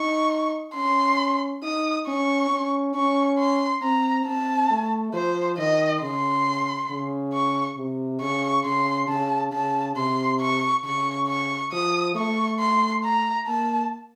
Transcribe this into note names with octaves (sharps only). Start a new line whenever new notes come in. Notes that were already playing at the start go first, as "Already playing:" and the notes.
Already playing: D#4 C#6
C#4 C6
D#4 D#6
C#4 C#6
C#4
C#4 C#6
C6
C4 A#5
C4 A5
A3
F3 C5
D#3 D#5
C#3 C6
C#3
C#6
C3
C#3 C#6
C#3 C6
C#3 A5
C#3 A5
C3 C6
C#6
C#3 C#6
C#6
F3 D#6
A3 C#6
C6
A#5
A#3 A5